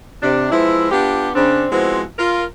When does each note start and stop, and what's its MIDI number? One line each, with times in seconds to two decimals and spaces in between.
0.22 0.48 48
0.22 0.48 62
0.52 0.90 53
0.52 0.90 56
0.52 0.90 59
0.52 0.90 64
0.91 1.30 59
0.91 1.30 62
0.91 1.30 65
0.91 1.30 67
1.35 1.65 49
1.35 1.65 60
1.35 1.65 62
1.71 2.03 53
1.71 2.03 56
1.71 2.03 59
1.71 2.03 60
1.71 2.03 64
1.71 2.03 66
2.18 2.43 65
2.18 2.43 70